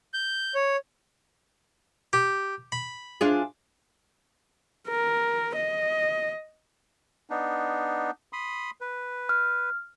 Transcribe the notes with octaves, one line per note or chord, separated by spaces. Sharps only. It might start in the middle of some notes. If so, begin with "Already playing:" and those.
G6
C#5
G4
B5
D4 F4 G#4
A#4
D#5
B3 D4 D#4
B5 C6 D#6
B4
F6